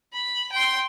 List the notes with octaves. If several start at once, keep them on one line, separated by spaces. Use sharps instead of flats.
B5
G5 C6